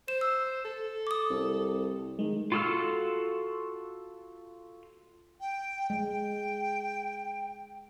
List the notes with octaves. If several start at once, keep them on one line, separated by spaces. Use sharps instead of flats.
C5 E7
E6
A4
D6 D#6
C2
D#3 G#3
F4 F#4 A4 E6 F6
G5
G#3 G5